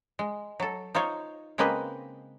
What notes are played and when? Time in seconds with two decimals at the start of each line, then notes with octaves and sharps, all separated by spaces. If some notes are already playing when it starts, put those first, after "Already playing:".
0.19 G#3
0.60 F#3 A4
0.95 D#4 F4 C5 C#5
1.58 C#3 G#3 A#3 C4 B4 D#5